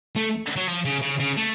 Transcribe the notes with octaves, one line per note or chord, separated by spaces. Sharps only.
A3
F#3
F3
C#3
C#3
C#3
A3